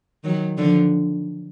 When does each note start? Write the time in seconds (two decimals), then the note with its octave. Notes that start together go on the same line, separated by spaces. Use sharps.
0.24 D#3 F#3
0.58 D3 F3